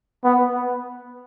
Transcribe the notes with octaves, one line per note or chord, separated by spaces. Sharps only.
B3